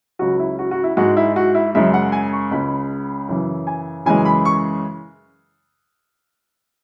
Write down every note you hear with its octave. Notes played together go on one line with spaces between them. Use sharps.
C#2 C#3 F#3 F#4
E4
F#4
F#4
E4
G#2 G#3 F#4
E4
F#4
E4
F#2 C#3 G#3 E5
F#5
G#5
C#6
C#2 C#3 G#3 B5
F#2 C#3 E3
G#5
F#2 C#3 E3 G#3 G#5
B5
C#6